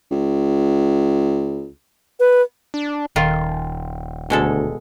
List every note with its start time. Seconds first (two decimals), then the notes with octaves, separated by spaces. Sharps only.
0.11 C#2
2.20 B4
2.74 D4
3.16 D#1 D#3 F4
4.30 D2 B2 G#3 A4